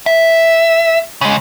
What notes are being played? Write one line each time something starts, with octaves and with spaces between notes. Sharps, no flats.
E5
C#3 G#3